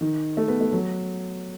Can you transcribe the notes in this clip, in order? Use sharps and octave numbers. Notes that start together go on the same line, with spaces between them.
D#3
A3
B3
A3
F#3